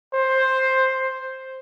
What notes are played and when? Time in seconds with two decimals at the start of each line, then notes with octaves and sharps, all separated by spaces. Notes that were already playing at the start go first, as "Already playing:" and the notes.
0.14 C5